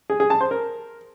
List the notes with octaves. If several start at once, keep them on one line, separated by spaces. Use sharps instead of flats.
G#4
G#4
A5
C5
A#4